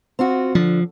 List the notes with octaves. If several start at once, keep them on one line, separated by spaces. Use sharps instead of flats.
C4 F4 F#4
D3 F3